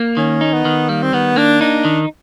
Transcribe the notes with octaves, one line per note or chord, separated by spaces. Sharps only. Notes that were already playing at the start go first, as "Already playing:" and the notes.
Already playing: A#3
D#3 C#4
D#4
B3
D#3
G3 A#3
C4
D#3 B3
A#3 D4
D4 D#4
D#3